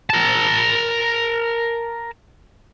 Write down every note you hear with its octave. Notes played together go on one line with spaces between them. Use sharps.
A#4 A5